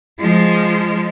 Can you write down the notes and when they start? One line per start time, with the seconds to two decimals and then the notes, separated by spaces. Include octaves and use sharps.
0.20 F3 G#3